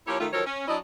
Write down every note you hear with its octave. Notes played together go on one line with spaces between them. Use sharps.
F3 A#3 E4 G4 C#5
D#3 A3 F4
D#3 F3 F#3 A4 A#4 C#5
C#4
F#3 D4 E4 D#5